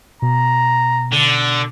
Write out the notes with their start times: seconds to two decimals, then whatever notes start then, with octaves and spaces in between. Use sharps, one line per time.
0.22 B2 A#5
1.13 D3